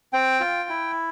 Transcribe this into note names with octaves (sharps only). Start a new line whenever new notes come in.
C4 G5
F4
E4